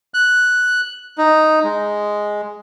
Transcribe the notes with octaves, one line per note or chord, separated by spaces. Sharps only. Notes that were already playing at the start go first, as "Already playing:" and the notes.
F#6
D#4
G#3